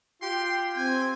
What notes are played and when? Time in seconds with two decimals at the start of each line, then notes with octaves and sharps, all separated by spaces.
0.22 F4 G4 G5 C6
0.76 C4 G#5